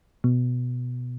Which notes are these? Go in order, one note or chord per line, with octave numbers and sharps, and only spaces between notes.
B2